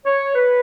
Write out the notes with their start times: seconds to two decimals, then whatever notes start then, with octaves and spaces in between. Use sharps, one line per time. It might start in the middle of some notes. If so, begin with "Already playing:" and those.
0.06 C#5
0.35 B4